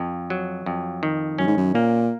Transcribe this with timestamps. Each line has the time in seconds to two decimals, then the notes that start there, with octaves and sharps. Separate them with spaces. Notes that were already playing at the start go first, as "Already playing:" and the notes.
Already playing: F2
0.30 F#3
0.66 F2
1.03 D#3
1.38 F#2 C#4
1.47 G#2
1.57 F#2
1.74 A#2 A#3